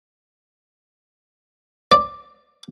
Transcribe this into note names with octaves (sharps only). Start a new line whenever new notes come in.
D5